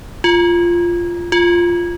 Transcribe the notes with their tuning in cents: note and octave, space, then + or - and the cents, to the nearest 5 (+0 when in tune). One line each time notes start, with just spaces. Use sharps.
F4 -10
F4 -5